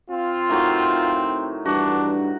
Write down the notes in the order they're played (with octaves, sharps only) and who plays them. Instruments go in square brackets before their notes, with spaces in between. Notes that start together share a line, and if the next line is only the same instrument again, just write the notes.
[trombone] C4 [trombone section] F4
[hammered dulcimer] A2 D#3 F#3
[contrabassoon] G2 [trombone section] E3 [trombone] D4 [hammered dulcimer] F#4